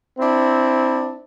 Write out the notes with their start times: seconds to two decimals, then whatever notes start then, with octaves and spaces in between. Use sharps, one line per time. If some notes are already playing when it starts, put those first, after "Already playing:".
0.19 C4 D4 E4